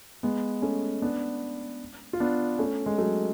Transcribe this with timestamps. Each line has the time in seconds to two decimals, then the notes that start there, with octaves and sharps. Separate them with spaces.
0.23 G#3 B3
0.62 A3 C#4
1.02 B3 D4
2.13 F4
2.20 B3 D4
2.59 A3 C#4
2.86 G#3
2.98 F#3 A3